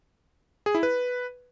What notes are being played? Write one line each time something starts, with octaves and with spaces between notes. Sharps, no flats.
G#4
E4
B4